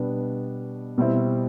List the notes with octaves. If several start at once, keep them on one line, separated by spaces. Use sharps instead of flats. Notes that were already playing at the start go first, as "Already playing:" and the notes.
Already playing: B2 G3 B3 D4
B2 G3 C4 E4